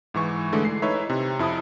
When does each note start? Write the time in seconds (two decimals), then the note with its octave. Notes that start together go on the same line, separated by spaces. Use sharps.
0.14 G#2 E3 C#6
0.53 D3 E3 G#3 A3
0.65 C7
0.82 D#4 E4 B4 C#5 E5
1.10 C3
1.39 F2 E4 A5 D#6